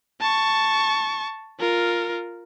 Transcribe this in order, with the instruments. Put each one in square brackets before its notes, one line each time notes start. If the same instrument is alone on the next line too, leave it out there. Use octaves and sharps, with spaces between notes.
[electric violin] A5 C#6
F4 A#4